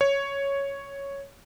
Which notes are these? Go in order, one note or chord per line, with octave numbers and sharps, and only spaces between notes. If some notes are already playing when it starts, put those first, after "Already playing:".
C#5